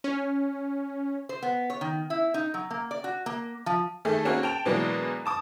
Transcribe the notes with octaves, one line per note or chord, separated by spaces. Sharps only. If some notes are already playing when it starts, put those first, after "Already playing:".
C#4
C5
B3
C#5
D#3
E4
D#4
F#3
A#3
D5
F#4
A#3
F3
D#3 A3 G#4 A4
A#3 C4 C#4 F#4 G#4
G5 A5 F7
B2 E3 F#3 G#3 A#3 D4
A5 D6 D#6